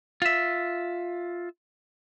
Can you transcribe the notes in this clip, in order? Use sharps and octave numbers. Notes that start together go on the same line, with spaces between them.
F4 E5